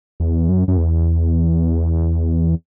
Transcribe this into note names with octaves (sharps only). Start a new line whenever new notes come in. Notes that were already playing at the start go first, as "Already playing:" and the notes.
E2
F#2
F#2
E2